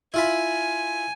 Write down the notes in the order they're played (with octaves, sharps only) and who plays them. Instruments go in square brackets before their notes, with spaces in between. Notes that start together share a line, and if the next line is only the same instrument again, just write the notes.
[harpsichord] E4 F4 B5 [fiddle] G#5